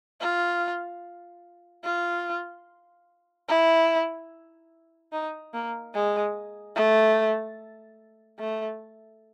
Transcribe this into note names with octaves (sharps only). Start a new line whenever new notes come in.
F4
F4
E4
D#4
A#3
G#3
A3
A3